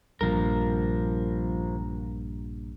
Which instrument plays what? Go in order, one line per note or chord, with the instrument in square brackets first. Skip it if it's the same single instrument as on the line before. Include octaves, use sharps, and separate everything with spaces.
[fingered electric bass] A#1 G2 [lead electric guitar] F3 A#4